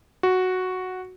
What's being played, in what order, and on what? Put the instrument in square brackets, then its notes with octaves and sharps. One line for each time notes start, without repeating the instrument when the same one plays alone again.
[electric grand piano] F#4